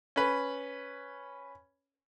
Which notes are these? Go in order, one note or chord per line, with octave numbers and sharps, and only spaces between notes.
C#4 B4